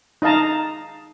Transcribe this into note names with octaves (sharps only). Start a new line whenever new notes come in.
D#4 D#5 F5 A5 A#5